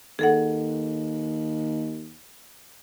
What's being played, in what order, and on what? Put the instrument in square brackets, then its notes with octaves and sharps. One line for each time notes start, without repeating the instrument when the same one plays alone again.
[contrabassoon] D#2 [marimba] G#4 A4 F#5